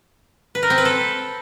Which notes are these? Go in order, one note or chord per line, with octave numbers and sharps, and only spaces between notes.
B4
A#4
C4
B4
A4